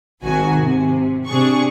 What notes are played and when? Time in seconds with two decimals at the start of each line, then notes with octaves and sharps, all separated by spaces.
0.23 G#1 D#3 F#4 G#5
0.60 C3
1.28 C3 D4 G#4 C#6